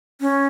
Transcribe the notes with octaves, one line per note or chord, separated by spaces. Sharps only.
C#4